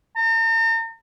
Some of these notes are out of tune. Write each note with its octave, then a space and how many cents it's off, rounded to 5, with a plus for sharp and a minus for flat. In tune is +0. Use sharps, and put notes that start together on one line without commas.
A#5 -45